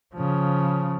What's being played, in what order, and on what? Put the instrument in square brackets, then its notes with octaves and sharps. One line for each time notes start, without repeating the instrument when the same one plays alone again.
[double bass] C#3 F3